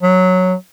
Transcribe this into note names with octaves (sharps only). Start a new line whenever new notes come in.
F#3